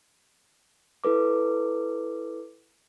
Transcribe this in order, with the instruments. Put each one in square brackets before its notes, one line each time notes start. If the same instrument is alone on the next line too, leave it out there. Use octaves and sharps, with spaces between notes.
[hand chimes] E4 A4 B4 D6